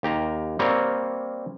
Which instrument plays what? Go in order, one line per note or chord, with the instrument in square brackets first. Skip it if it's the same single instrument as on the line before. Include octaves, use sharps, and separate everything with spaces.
[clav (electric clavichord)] D#2 G4 A#5
G3 A#3 C4 A#4 C#5